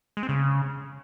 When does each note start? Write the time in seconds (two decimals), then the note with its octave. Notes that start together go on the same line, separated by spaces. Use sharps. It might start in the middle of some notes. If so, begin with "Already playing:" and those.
0.17 G#3
0.23 C4
0.29 C#3